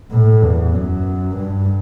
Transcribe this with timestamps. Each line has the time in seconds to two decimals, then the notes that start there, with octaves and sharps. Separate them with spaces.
0.11 A2
0.43 E2
0.74 F#2
1.36 G2